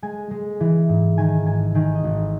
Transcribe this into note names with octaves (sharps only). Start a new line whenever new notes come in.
G#3 G#5
G#3
E3
G#2
D#3 G#5
G#1 G#5
D#3 G#5
D#5
G#1